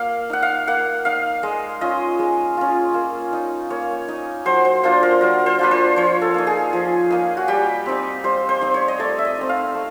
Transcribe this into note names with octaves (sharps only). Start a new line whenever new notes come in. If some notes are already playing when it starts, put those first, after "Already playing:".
Already playing: A#3 F5
D#4 F#5
F5
A#3 F#5
D#4 F5
G#3 D#5
C#4 F4 D#5
G#3
C#4 F4
A#3
D#4
A#3 C#5
D#4
F#3 C5
C5
A#3 D4 F4 C5
A#4
F#3 A#4
C5
A#3 D4 F4 B4
C5
F3 C#5
A4
A#3 D#4
G#4
F3
A#3 D#4
F#4
G3 G4
C4 D#4
G3 C5
C5
C4 D#4
C#5
D#5
A3 D5
E5
D#5
C4 D#4
F5
A3